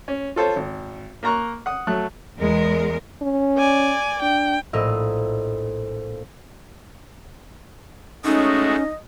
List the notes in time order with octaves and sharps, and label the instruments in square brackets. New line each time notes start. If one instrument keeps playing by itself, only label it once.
[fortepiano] C#4
F4 A4 C5 C#5
G#1
A#3 A#4 A#5 C#6 F#6
F#5 D#6
F#3 A3 F#6
[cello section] E2 G#3 A#4
[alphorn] C#4
[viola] D5 G#5
[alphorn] D4 [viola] G5
[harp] A#1 A2 A#4 D#5 E6
[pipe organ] G#3 A3 F#4 [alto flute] C#4 [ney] D#4 [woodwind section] D#5